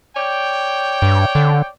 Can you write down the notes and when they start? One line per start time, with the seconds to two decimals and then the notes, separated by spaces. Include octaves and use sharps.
0.17 C#5 D5 G5
1.02 G2
1.35 D3